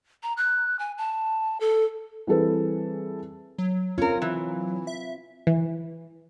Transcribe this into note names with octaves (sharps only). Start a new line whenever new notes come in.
A#5
F#6
G#5
A5
A4
E3 G3 C4 G#4 A4 B4
F#3
C4 C#4 F4 A#4
E3
E5
E3